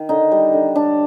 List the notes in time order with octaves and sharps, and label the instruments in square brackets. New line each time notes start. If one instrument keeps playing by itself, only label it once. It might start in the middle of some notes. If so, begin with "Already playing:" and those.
Already playing: [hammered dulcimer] D#3
D3 D#4
G3
D3
G3 D4